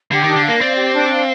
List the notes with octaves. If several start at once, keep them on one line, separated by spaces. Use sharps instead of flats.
D3 G4
D#3 D4
D3
A#3 F5
C4 D5
G4
D4
F5